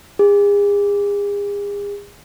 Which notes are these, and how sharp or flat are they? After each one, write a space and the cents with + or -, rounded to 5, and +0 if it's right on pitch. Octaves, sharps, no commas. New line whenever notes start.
G#4 -40